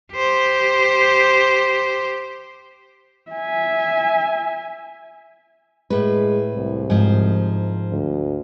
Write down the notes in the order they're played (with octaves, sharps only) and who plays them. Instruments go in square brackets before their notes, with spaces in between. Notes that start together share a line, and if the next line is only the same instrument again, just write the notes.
[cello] G4 C5
[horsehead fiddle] E5 G#5
[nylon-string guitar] A2 B4 [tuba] G#3
[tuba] C2
[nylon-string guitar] G#2 F3
[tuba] D2